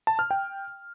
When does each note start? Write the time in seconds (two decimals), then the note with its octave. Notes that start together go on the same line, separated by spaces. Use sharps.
0.07 A5
0.19 F6
0.31 G5